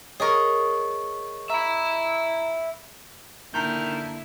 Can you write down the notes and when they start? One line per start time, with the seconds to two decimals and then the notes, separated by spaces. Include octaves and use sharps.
0.20 G#4 A#4 C#5 D#5 C#6
1.50 E5 A#5 B5
3.54 D3 D#3 A#3 E4 A5 A#5 G6